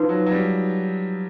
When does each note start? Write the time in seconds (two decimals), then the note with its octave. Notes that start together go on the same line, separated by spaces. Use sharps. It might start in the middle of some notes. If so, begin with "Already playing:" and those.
Already playing: F3 D#4 F#4 B4
0.09 F#3
0.26 F#3
0.31 G3